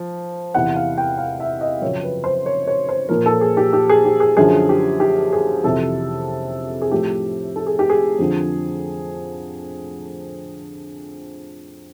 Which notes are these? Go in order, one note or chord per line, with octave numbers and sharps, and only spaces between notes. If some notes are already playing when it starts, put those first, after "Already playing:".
Already playing: F3
E2 C3 E3 F#5
F5
G5
F5
E5
D#5
F#2 C#3 F3 C#5
B4
C5
C#5
C#5
C5
A#2 F3 A#4
A4
G#4
G4
G4
G#4
G4
G#4
F#2 D3 F3 G#4
G4
G4
G#4
F2 C3 E3 A4
G#4
A2 F3 G4
A4
G#4
G4
G#4
F2 D3 F3